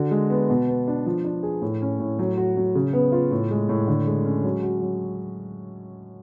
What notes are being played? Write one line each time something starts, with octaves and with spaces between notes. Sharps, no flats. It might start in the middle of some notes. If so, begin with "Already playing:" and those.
Already playing: D3 F#4
G#3
B3
B2
B3
D4
F3
D4
G#4
A2
C#4
A2
F#3
F#4
F#3
C#3
B3
F4
A2
G#3
A2
D3
G#3
C#4
F#3
F#4
F#3